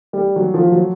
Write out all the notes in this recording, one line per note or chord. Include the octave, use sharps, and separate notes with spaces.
G3
F#3
F3
F#3